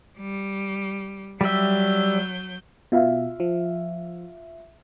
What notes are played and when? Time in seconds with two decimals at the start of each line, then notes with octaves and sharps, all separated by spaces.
0.18 G3
1.41 F#3 G3 E5 G6
2.92 B2 F4 E5 F5
3.40 F3